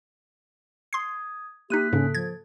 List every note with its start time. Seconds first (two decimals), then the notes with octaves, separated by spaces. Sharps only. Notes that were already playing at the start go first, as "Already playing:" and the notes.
0.93 C6 D#6 G#6 C7
1.70 A#3 D#4 G4 F#6 B6 D#7
1.93 G#2 C#3 C#4 A4
2.14 F3 G#6 A6